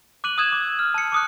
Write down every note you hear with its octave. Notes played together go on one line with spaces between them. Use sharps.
D6 F#6 D#7 F#7
D#6 E6 F#6 G#6 E7
D6
F6
A5 C#7
D6 D#6 F#6